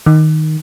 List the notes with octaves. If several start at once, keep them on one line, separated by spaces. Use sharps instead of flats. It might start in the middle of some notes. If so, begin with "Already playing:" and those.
D#3